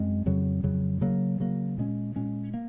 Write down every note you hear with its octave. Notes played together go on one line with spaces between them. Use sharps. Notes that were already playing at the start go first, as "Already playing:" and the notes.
Already playing: F#2 G#3 C4
F2 C#3 F#3
F2 C#3 F#3
C#3 F#3 A#3
C#3 F#3 A#3
A#2 G#3 C#4
A#2 G#3 C#4
A#3